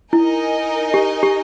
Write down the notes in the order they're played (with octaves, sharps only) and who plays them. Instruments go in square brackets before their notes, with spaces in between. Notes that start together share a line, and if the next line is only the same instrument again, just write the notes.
[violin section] D#4 A#4 D#5 G#5 [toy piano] E4
[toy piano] G4
G4